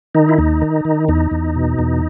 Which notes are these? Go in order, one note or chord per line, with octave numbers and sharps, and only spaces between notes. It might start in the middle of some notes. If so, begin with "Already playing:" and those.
D#3 D#4
E4
D#2 D#4
D#3
D#3
E2 D#4
E2
B2
E2